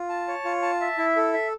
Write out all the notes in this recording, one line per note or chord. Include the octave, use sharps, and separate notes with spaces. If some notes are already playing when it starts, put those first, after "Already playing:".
Already playing: F4
A5
C#5
F4
A5
E5
E4
A4
E5